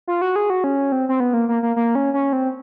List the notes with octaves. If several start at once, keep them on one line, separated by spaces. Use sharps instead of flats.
F4
F#4
G#4
F#4
C#4
C4
C4
B3
A#3
A#3
A#3
A#3
C#4
C#4
C4